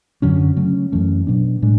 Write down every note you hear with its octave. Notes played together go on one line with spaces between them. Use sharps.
F#2 D3 F#3 C#4
C#3 F#3 A3 C#4
F#2 E3 A3 C#4
B2 F#3 B3 D4
A2 G#3 D4